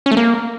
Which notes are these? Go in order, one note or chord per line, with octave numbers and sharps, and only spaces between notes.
C#4
A3
A#3